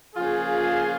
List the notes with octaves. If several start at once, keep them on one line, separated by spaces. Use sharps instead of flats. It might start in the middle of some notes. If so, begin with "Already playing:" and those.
C#3 F3 A#3 F4 G#4